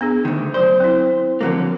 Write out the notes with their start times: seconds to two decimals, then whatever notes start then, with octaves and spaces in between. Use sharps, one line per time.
0.01 B3 D4 G#4
0.25 D2 D#3
0.54 F#3 C5 D5
0.80 C4 E4
1.41 D3 F3 F#3 A#3 C4